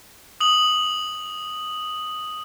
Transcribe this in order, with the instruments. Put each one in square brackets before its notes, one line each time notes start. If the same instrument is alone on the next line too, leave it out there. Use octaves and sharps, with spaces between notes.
[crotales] D#6 F#7